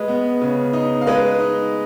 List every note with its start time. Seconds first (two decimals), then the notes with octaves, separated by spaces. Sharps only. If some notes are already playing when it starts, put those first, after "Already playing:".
Already playing: G#3 B4 D#5
0.08 B3
0.41 C#3
0.73 D#4
1.01 F5
1.07 G#3 B4 D#5
1.40 D#4